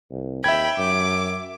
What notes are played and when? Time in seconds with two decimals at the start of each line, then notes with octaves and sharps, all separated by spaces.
0.11 C2
0.44 D#2 E5 G5 B5 G#6
0.78 F#2 D6